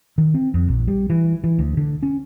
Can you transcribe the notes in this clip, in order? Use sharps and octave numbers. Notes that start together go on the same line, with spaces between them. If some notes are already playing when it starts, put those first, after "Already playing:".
D#3
C4
F2
A#1
G3
E3
E3
D2
D3
C#4